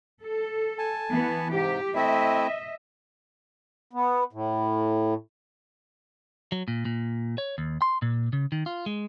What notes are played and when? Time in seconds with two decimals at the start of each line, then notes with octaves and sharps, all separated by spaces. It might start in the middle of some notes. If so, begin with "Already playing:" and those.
0.23 A4
0.78 G#5 A5
1.11 E3 B3
1.52 G#2 C3 G4
1.95 A3 C4 E4 D#5 E5
3.93 B3
4.33 A2
6.52 F#3
6.68 A#2
6.85 A#2
7.38 C#5
7.58 D#2
7.82 C6
8.02 A#2
8.33 C#3
8.52 D#3
8.66 F4
8.86 G#3